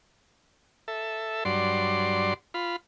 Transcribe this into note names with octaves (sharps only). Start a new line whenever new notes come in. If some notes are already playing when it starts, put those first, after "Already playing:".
A4 E5
G2 F#3 D5 C6
F4 B5